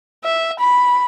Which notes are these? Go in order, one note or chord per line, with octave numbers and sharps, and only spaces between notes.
E5
B5